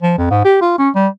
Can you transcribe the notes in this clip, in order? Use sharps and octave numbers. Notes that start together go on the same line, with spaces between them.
F3
F2
G#2
G4
F4
C#4
G3